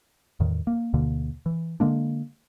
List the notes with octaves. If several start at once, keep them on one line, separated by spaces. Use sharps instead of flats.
E2 A2 D#3
A#3
D2 B2 D3 A#3
E3
D3 G#3 A#3 D4